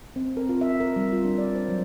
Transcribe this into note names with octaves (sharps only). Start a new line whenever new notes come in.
C4
A#4
F4
E5
A#4
G3
F4
D4
D5
C5
F#3